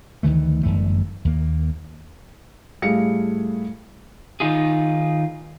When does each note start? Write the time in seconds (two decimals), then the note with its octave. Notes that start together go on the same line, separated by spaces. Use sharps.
0.23 D2 D#3 E3 A3
0.63 G1 F#2 E3 A3
1.25 D#2 A#3
2.82 A2 G3 A3 G#4 F5 C#7
4.40 D#3 D#4 F4 G#4